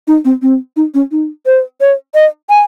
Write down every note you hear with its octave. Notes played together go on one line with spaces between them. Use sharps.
D#4
C4
C4
D#4
C#4
D#4
C5
C#5
D#5
G#5